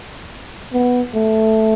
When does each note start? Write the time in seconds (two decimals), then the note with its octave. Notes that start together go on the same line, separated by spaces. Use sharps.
0.73 B3
1.15 A3